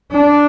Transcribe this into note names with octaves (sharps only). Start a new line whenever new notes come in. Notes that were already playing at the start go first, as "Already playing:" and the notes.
D4